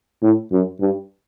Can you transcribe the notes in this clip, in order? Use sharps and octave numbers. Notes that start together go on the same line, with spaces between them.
A2
F#2
G2